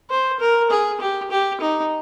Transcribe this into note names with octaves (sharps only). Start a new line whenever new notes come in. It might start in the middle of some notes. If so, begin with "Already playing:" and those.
C5
A#4
G#4
G4
G4
D#4